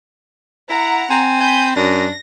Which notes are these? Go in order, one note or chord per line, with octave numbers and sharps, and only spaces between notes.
E4 F#5 A#5
C4 G#5
G#5 B5 G6
F#2 D4 A#6